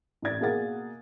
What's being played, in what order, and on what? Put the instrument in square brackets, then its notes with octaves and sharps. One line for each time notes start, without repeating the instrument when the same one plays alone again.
[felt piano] A1 A2 E4 D5 G#6 A6
B2 A#3 G#4 F5 F#5 A6